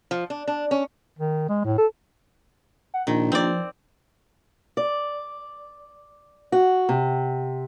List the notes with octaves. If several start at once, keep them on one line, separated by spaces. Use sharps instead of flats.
F3
D4
D4
C#4
D#3
G#3
A2
A4
F#5
A#1 A#2 D#3
F3 C4 D5
D5
F#4
C3